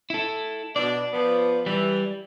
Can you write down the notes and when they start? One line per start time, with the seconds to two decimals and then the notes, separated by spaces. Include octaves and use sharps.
0.10 E4 A4
0.76 B2 D4 D5
1.13 F3 B3
1.66 E3 G3